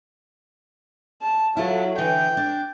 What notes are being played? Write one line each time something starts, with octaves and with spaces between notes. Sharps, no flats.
A5
F#3 E4 F4 A4
D3 E3 D#4 G5
D4